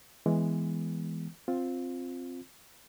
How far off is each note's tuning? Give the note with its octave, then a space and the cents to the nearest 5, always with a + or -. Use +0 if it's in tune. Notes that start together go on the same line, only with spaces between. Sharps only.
E3 -5 G#3 +0 B3 +0
C4 +0 F4 +10